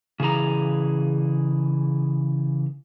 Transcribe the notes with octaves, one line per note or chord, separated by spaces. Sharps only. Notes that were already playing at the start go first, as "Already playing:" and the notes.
C#3 E3 G#4 A#5